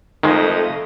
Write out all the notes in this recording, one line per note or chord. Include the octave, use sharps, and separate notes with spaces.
F2 D#3 G#3 A3 D#5